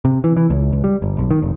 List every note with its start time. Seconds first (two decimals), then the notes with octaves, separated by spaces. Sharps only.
0.05 C3
0.24 E3
0.37 E3
0.50 C#2
0.72 C#2
0.84 G3
1.02 G1
1.18 B1
1.31 D#3
1.42 F1